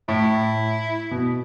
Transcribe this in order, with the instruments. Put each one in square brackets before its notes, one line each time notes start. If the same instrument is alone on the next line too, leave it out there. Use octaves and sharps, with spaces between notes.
[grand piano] A2 [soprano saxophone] E4
[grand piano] B2